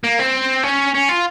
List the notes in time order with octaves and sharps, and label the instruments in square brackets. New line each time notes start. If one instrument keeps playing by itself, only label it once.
[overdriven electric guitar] A#3
C4
C#4
C#4
F4